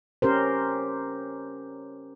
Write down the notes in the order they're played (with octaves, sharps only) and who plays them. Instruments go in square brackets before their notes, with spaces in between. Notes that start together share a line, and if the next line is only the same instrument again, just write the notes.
[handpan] C#4 G4 A#4 C5